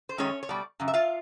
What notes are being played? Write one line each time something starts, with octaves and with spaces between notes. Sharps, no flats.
C5
F#2 D#3 G#3 C#4 C#5
C#5
B2 G3 D5
F#2 C#3
E5
F4 F5